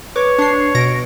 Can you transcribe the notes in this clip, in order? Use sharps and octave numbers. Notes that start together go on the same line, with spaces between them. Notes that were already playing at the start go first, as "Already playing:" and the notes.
B4 C#5 D6
D4 C7
B2 A#6 D7